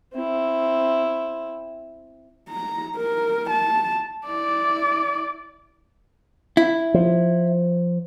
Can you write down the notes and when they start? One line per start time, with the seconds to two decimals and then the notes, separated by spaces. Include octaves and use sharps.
0.13 C4 E4
2.50 A#5
2.96 A#4
3.50 A5
4.26 E4 D5
6.57 E4
6.94 F3